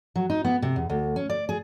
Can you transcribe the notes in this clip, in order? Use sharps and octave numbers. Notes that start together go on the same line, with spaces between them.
F#3
D#4
B3
C3
E2
D2
C#4
D5
G#4